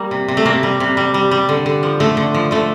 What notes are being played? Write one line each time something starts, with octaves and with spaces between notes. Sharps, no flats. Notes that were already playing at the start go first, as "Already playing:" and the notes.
Already playing: G3 A#3
C3
C3
A3
C3 A#3
G3
C3
G3
G3
G3
D3
D3
F3
D3 A3
D3
F3
D3 A3